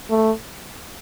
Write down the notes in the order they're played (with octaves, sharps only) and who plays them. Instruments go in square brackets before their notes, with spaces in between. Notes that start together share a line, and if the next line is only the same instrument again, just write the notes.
[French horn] A3